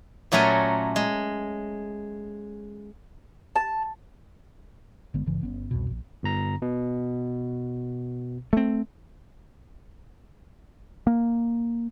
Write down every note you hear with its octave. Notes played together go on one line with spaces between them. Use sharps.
A#2 F#3 A3 C#4 A#4 G#5
G#3
A5
G1 D3 G#3 B3
G#1 G2 C#3 E3
G1 B3 C#4
C2 F2 B2
A#1
G1 A#5
B2
A3 C4
A#3